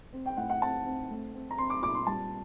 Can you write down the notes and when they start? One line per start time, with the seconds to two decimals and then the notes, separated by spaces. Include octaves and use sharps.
0.13 C4
0.26 G5
0.37 A2 F#5
0.50 F#5
0.62 C4 A5
0.86 C4
1.10 A3
1.34 C4
1.51 A#5
1.58 C4 C6
1.70 D6
1.82 A#2 D6
1.95 C6
2.07 G3 A5